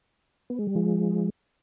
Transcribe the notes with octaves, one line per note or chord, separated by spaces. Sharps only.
B3
G#3
G3
F3 G#3